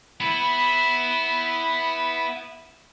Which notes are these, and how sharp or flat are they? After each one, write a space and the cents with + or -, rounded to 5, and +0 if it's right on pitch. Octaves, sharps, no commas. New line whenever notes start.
B3 +0 E4 -10